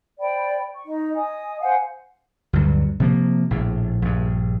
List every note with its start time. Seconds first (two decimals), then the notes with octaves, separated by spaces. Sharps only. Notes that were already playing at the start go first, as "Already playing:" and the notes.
0.19 C5 D5 G5 B5
0.74 C#6
0.86 D#4 D#5
1.14 D#5 G#5 D#6
1.61 C5 F5 F#5 G#5
2.53 D2 G2 F#3
3.00 C3 F3 A#3
3.51 A#1 A2
4.02 A#1 G2